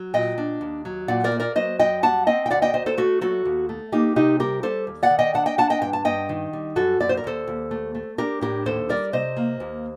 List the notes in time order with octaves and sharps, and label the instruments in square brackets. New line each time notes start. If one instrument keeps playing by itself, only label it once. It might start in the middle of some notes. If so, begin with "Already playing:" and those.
Already playing: [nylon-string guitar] F#3
A#2 D#5 G5
D4
D#2
F#3
A#2 D5 F#5
A#4 D5
A#3
A#4 D5
F#3 C5 D#5
F#2 D#5 G5
G3 F#5 A5
C4 D#5 G5
G5
D2 D5 F#5
D#5 G5
D2 C5 D#5
A4 C5
A3 F#4 A4
F#3 F#4 A4
D#2
A3
A#3 D#4 G4
C3 D#4 G4
G3 G4 A#4
G3 A4 C5
D#2
D5 F#5
D#3
D#5 G5
D4 F#5 A5
D#5 G5
D4 F#5 A5
D#5 G5
G2 G5
A5
G2 D#5 G5
D#3
G3
F#2 F#4 A4
F#2 D5
C5
A#4
D#2 A4 C5
D#2
A3
A3
D4 G4 A#4
A2 G4 A#4
D#2 A4 C5
G3 A#4 D5
C3 C5 D#5
A#3
D#2